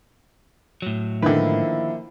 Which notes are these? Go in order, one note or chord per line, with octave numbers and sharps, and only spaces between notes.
A2 F#3
D3 D#3 F3 A#3 E4 B4